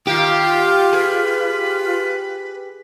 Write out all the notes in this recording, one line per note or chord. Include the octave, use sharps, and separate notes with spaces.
D#3 F4 G4 F5
G#4 B4